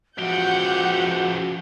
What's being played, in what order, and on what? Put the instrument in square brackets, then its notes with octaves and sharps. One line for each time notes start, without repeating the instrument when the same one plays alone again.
[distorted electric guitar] C#2 G4 [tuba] F3 [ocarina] F#4 [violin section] F#5 G6